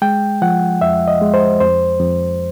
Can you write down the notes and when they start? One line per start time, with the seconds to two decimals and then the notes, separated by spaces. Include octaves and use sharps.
0.02 G#3 G5
0.42 F3 F#5
0.81 F2 E5
1.08 D#5
1.22 G#3
1.34 C5
1.60 F2 C5
2.00 F2